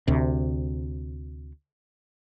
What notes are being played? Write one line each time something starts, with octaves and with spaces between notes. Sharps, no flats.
D2 C3